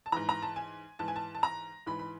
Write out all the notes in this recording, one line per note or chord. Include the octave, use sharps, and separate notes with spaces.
A5
G#2 E3 A#5
A#5
A5
G#5
G#2 E3 A5
G#5
A5
A5
A#5
G#2 E3 B5
B5